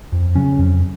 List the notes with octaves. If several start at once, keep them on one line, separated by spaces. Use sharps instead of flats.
F2
C#3 F#3 C#4
F2